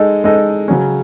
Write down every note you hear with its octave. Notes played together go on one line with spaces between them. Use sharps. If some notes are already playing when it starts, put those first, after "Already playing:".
Already playing: G#3 D#4 A4 D#5
G#3 D#4 A4 D#5
C#3 F#3 C#4